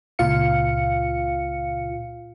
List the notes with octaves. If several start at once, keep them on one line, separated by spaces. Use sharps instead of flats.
C#2 A#2 F4 F5 C#7